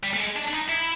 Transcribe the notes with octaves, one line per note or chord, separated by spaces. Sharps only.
G3
A3
G#3
D4
D4
D#4
E4